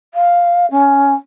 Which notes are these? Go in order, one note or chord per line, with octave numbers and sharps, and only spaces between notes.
F5
C#4